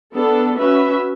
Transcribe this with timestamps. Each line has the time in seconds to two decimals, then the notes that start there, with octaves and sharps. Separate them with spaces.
0.15 B3 D4 A4
0.58 C#4 F#4 B4 E5